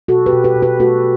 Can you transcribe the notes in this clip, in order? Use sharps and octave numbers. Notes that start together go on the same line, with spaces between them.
B2 F#4 A4
G4 B4
B2
G4 B4
B2
G4 B4
A3 F#4 A4